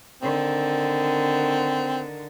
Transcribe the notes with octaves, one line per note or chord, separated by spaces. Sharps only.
D3 D#3 C4